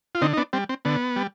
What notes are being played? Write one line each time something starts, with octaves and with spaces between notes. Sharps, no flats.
F4
D3 C4 D#4
D#4
B3 D4
G3 C4
C4
D3 B3
G3